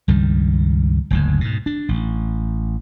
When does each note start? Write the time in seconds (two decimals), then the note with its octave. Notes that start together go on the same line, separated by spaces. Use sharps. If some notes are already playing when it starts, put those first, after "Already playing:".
0.08 C#2 G2 D#3 G3
1.10 F#1 D2 G#2
1.41 G#2 B2
1.66 D4
1.89 A1